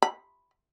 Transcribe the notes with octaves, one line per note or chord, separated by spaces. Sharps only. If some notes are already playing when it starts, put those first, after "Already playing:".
B5